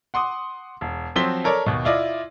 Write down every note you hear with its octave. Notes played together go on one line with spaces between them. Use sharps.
F#5 C6 D6 D#6
E1
F3 F#3 C4 C5 B6 G7
A4 A#4 C#5 D5 A5
D#2 B2
E4 F4 D5 D#5